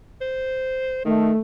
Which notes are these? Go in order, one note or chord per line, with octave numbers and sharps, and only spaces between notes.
C5
D#3 A3